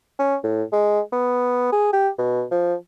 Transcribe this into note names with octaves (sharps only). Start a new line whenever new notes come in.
C#4
A2
G#3
B3
G#4
G4
B2
F3